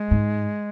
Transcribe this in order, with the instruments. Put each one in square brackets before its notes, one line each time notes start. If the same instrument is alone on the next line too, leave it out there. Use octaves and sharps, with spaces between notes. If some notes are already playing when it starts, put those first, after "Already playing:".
Already playing: [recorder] G#3
[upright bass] G#2